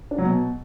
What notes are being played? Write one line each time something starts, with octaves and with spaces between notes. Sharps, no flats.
D4
F#3
B2